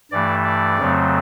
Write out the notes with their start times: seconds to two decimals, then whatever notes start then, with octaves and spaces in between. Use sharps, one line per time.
0.11 G2 E3 A3 D5
0.44 D5
0.78 F2 C#3 F#3 A3 C4